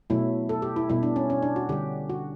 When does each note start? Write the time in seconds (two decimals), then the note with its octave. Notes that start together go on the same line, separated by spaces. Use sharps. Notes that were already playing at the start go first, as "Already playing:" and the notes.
0.10 B2 F#3 A3 E4
0.49 A4
0.62 G4
0.76 E4
0.89 B2 G3 E4
1.03 D4
1.16 C#4
1.30 C#4
1.43 D4
1.56 F#4
1.69 D3 G3 G4
2.09 F#4